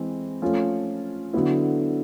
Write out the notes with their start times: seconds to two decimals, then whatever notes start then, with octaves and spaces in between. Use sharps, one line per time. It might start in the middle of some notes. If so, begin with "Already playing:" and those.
Already playing: E3 G#3 C4
0.42 F3 A3 C#4 F4
1.33 D3 F#3 B3 E4